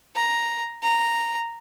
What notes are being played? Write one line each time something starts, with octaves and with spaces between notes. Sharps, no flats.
A#5
A#5